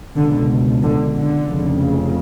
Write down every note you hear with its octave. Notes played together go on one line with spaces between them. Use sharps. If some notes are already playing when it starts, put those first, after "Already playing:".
C#2 B2 D3
D3
D3
F1 F2 C#3